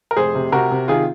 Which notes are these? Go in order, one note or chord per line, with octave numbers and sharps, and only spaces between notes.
A#4
F1 G#4 C5
C3
C3 F#4 A#4
C3
D#3 F4 G#4